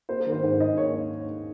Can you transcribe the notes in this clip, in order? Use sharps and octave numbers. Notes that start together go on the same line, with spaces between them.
A#3 C5
A#4
D#3
C5
G#2
G#2 D#5
A#3 C#5